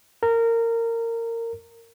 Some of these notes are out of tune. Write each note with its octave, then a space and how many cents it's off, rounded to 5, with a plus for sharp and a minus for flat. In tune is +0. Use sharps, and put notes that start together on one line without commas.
A#4 -20